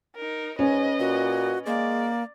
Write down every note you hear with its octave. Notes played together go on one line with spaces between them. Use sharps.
D#4 A#4
G#2 C#4 B4 D#5
A#2 F#4
G#3 A#3 D5